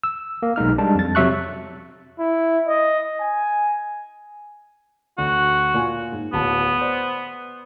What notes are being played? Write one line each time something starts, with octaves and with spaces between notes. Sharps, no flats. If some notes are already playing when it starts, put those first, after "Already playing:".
E6
A#3
B1 G#3 D#4 F6
G3 G#3 D4 A5
F2 A6
F2 C3 F#3 E5 C#6 F#6
E4
D#5
G#5
D2 F#4
A#2 F4 G#5
G#2
D1 B3 A5
C5 D5